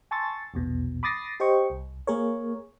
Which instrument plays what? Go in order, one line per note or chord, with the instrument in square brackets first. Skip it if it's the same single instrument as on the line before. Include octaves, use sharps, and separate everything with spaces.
[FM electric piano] G#5 A5 C6 C#6 E6 A6
A#1 E2 B2
B5 D6 D#6 A6 A#6 C7
G4 C5 D#5 G5 C#6
C2
A#3 G#4 A#4 C#5